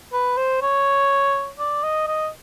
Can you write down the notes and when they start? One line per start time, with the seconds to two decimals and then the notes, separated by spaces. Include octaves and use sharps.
0.13 B4
0.37 C5
0.62 C#5
1.59 D5
1.83 D#5
2.08 D#5